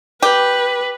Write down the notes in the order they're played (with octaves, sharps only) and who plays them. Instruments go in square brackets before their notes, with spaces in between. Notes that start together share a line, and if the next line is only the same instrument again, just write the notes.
[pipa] G4 [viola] B4